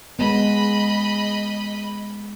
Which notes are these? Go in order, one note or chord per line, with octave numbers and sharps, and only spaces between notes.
G#3 B3 D#5 B5